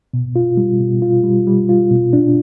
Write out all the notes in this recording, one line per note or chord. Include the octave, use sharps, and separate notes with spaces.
B2
F4
G3
B2
F4
G3
G3
F4
B2
D4